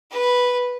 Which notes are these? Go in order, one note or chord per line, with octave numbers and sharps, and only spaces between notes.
B4